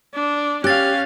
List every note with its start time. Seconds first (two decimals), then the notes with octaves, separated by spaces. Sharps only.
0.14 D4
0.64 C#4 G4 F5 F#6 A6